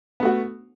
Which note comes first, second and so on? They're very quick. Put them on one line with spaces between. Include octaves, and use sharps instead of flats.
B3 A3 F#4